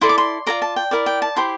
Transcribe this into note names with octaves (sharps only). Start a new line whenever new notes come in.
E4 A4 D5 C6
D6
C6
F4 A4 D5 A#5
A5
G5
E4 A#4 D5
G5
A5
E4 G4 C5 C6